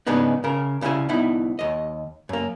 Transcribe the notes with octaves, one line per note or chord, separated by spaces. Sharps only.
G#2 C#3 G#3 B3 D4 D#4
C#3 A#4
C2 C#3 E3 E4 G#5
C2 B3 D#4 E4
D#2 D#5
F#2 A#3